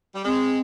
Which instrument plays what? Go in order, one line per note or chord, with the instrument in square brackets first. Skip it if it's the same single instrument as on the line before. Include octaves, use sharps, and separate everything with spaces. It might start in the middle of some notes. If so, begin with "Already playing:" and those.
[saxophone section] G3
[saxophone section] G#3 [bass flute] C4